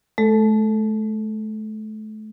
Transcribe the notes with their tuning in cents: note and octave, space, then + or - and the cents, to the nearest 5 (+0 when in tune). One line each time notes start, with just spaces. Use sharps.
A3 -35 A4 +0